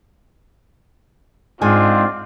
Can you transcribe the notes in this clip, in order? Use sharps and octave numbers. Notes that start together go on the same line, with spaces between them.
G#2 G#3 C4 D4 F4 G#5